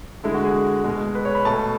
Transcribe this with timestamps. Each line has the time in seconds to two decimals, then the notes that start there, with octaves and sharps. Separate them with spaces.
0.23 D3 G#3 E4
0.34 F#4
0.44 G#4
0.84 B2 G#3
1.15 B4
1.25 C#5
1.35 B5
1.45 B2 A3 A5